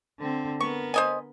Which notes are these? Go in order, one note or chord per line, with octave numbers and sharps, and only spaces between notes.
D3 C4
B3 A#4 C#6
C5 D#5 G#5